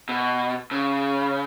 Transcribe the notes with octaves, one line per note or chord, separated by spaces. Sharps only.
B2
C#3